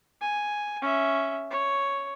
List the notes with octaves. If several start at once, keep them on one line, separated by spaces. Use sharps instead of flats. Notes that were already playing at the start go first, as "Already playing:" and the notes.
G#5
C#4 E5
C#5